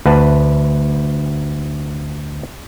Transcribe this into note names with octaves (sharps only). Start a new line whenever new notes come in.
D2 B4 F#5 A5